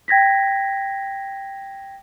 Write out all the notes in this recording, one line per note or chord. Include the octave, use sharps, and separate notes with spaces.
G5 G#6 A#6 B6